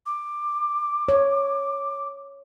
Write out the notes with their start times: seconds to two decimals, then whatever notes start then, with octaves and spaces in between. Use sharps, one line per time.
0.06 D6
1.09 C#5